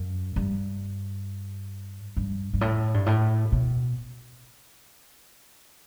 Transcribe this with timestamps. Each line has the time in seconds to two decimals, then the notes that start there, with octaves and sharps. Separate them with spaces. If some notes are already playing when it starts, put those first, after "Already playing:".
Already playing: F#2
0.36 G2
2.17 G2
2.53 G2
2.61 A2
2.94 G2
3.06 A2
3.52 B2